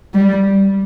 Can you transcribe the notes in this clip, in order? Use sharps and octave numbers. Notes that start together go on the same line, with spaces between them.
G3